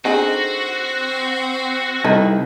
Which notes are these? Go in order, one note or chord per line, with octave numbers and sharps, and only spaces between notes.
D3 C4 D#4 F#4 G#4
C2 D#4 A4 B4